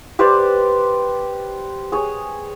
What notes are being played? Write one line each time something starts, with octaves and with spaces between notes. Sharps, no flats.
G4 B4 C5 D5
G#4 C#5